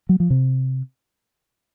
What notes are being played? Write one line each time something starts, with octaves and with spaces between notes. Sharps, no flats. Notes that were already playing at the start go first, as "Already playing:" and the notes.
F#3
F3
C3